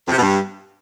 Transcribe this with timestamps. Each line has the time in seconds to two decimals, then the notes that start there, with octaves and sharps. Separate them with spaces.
0.06 F2
0.12 C3
0.17 B2
0.22 G2